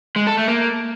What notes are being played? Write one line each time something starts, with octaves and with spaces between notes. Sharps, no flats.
G#3
A4
A3
A#3